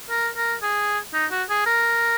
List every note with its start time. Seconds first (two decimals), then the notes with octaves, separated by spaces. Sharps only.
0.10 A#4
0.36 A#4
0.62 G#4
1.14 D#4
1.31 F#4
1.49 G#4
1.66 A#4